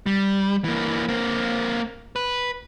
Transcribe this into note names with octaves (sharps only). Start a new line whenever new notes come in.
G3
E3 A#3
A#3 C4
B4